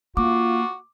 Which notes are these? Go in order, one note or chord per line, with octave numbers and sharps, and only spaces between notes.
A#3 F4 F#4 D6